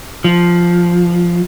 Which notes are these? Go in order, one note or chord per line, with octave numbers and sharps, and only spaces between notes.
F3